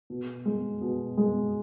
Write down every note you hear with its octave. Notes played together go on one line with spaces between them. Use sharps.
B2
G#3
B2
G#3